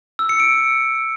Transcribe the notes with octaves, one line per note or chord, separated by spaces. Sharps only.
E6
C#7
D7